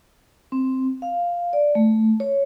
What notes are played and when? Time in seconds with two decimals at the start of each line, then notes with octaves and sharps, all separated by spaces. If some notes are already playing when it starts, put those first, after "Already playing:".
0.52 C4
1.02 F5
1.53 D5
1.75 A3
2.20 C#5